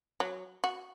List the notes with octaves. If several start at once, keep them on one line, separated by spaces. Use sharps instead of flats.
F#3
F#4